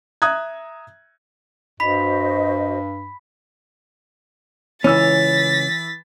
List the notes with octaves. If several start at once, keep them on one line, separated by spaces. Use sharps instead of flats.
E5 A#5 D#6 F#6 G#6
G2 F#4 C5 D#5 B5 B6
C#2 E3 C#4 E6 A6 B6